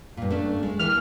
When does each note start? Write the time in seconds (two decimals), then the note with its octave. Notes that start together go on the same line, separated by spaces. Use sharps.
0.17 G2 A#2
0.30 A3 C#4 D4
0.63 G#3
0.79 D#2 E3 F6